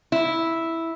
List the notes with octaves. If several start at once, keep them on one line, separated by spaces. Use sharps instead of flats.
E4